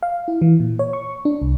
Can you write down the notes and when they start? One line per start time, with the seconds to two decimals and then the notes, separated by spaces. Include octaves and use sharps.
0.03 F5
0.28 E4
0.42 E3
0.60 A#2
0.79 C#5
0.93 C#6
1.25 D4
1.42 C2